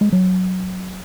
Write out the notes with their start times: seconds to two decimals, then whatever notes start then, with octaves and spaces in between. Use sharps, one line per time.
0.01 G#3
0.12 F#3